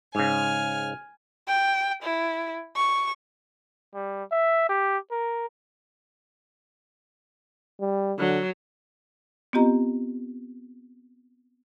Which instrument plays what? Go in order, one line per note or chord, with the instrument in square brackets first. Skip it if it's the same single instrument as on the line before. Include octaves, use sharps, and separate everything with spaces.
[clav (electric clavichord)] G#2 C#3 [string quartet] G#5 F6
[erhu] G5
E4
C#6
[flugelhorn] G3
E5
G4
A#4
[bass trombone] G3
[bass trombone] D3 [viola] F#3
[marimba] B3 C4 F4 G4 D#5 A#5